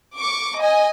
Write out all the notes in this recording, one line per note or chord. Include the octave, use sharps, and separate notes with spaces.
C#6 D6
D#5 G#5